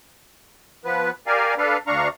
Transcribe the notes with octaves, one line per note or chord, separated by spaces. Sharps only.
F3 B3 B4
G4 A#4 D5 F5 G#5
D4 A4 B4 F5
D2 D4 F5 A#5 C#6